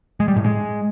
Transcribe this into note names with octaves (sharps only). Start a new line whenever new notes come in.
G#3
G3
A2
G#3